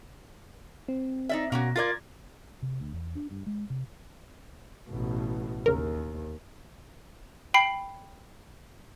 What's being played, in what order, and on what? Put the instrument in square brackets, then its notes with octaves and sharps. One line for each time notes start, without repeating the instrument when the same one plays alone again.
[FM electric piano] C4
[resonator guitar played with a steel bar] D#4 D5 E5
[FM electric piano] B2 [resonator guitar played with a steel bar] A#3 C#4 F#4
[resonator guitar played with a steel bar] F4 A#4 D5 [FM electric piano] G#6 A6
[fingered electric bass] C3
D2
E2
D4
G2
G#3
C3
[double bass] A1 B2
[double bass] D#2 [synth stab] C#3 A#4
[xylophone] G5 B5 C7